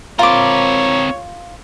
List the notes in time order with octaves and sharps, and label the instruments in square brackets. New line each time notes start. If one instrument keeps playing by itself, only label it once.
[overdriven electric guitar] C4 A#4 [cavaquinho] F4 D6 [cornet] C#5